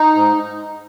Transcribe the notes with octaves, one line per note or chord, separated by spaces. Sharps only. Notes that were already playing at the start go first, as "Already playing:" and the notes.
Already playing: D#4
G#2